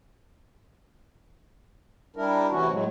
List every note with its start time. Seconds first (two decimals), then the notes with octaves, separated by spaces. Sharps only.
2.16 G3 D4 E4 A#4
2.50 C3 E3 A3 C#4 E4 F#4
2.70 A2 F#3 G#3 A3